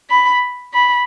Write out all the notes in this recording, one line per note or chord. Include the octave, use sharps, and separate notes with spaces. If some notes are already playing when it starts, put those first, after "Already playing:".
B5
B5